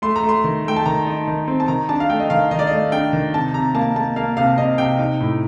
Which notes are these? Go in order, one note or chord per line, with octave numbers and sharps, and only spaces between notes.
A3 C6
A#5
A3
C6
D#3
A3 G5
A5
D#3 A#5
D#4
D#3
C4
A5
D#3 A#5
D4 A5
F5
A3 G5
D#5
D#3 F5
D#3 D#5
D5
A3 D#5
D4 G5
D#3
C3 A5
C3 A#5
A#3 A5
A#3 A5
A#3 F5
C3 F5
C3 D#5
C3 G5
D#4
A2